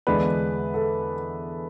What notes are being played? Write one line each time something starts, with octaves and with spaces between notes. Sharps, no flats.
E2 D3 G#3 D4 B4
A4